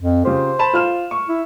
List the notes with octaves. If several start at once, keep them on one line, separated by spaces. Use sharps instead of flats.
F2
C#3 F4 G4 C5
A5 B5 E7
F4 F6 E7
C#6
E4